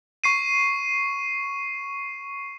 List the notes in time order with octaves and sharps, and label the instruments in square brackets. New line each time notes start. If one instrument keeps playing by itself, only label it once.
[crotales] C#6 C7 D#7